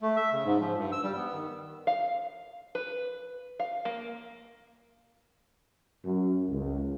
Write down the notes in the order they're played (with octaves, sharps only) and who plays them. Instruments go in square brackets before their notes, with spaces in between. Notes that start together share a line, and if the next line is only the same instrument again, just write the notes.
[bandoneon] A3
E5
C#3
G#2
F3
G2
E6
G3
B3
D#3
[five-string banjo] F5
B4
F5
A#3
[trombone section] F#2
C#2